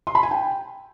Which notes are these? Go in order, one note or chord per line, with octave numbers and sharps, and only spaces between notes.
C6
B5
G#5
G5